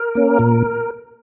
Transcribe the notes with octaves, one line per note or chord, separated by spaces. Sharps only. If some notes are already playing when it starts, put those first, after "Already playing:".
Already playing: A#4
A#3 C#4
A#2